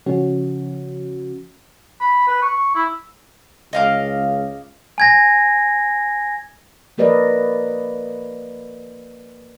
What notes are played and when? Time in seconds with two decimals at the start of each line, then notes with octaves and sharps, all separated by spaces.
0.06 C#3 F3 C#4 F#4
2.01 B5
2.28 B4
2.42 C#6
2.75 E4
3.73 C#2 D#5 F5 D6
4.98 G#5 G#6 A#6
6.98 F3 A#3 A#4 B4 D5 D#5